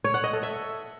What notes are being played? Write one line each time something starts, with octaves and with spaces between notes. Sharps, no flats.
C#5
F#5
D#5
A4
E5